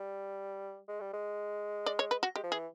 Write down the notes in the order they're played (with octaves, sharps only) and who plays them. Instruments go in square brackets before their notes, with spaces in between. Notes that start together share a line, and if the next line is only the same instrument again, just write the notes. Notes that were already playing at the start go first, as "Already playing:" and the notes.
Already playing: [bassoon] G3
G#3
G3
G#3
[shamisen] D5
C#5
B4
F#4
[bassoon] G#3 [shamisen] G4
[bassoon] F3
[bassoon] E3 [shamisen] G#4